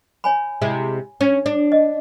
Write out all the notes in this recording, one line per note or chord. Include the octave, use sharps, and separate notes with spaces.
C#5 G#5 B5
C3 G#3 E4
C#4
D4
D#5